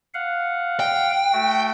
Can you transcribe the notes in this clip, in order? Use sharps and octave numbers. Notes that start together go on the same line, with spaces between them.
F5 F#5
G5
A3 F#4